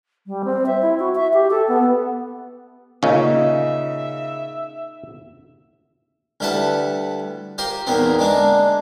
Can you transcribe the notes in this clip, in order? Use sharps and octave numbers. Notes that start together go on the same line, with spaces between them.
G3
C4
E5
E4
F#4
E5
G4
A4
B3
A#2 C#3 C#4 D#4 E5
D2 G3 E4 B4 F#5 A5
F4 G4 A#4 C5
E2 A#2 D#3 B3 C4
D3 G#3 A#3 D4